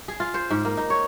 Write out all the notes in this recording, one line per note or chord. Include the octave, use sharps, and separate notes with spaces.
G#4
F4
C5
G#2
A#3
D#4
C#5